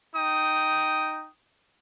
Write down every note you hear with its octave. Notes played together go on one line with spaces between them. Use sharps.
D#4 G5 D#6